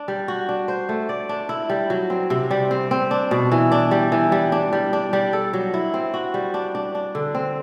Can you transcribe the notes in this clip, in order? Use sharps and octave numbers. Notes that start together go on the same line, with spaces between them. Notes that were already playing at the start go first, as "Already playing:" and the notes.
Already playing: D4
G3
F#4
D4
C5
A3
D5
D4
E4
G3
F#3
C4
C3
G3
C4
C4
D4
B2
E3
D4
G3
E3
G3
D4
G3
D4
G3
A4
F#3
E4
C4
F#4
G3
D4
D4
D4
D3
C4